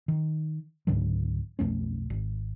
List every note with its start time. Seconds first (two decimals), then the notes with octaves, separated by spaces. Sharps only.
0.08 D#3
0.87 C#2 G#2 D3 F#3
1.59 B1 F2 A3 C#4
2.10 G#1